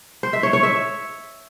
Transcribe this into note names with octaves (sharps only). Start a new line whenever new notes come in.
C5
E5
C#5
C#5
E5